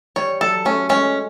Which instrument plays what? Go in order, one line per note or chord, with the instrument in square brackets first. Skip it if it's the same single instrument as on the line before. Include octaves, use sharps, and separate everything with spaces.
[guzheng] G3 [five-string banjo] C#5
[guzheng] F#3 [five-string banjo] A4
[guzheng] A3 [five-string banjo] C#4
[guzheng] G#3 [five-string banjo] C#4